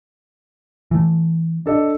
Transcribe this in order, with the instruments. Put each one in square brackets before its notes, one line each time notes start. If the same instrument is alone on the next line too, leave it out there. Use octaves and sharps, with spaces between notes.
[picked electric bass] E3 A3
[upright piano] D4 A4 D#5